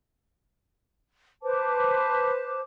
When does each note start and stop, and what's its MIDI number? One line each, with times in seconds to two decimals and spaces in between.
1.43 2.60 71
1.43 2.60 72
1.43 2.60 81
1.43 2.60 86